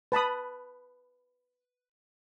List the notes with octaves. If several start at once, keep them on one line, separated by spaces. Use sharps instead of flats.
B4 A5 B5 D#6